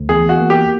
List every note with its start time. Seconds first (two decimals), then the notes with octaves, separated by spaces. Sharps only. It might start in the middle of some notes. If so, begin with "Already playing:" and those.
Already playing: D2
0.09 E2 G#4
0.29 F#4
0.40 A#3
0.50 G4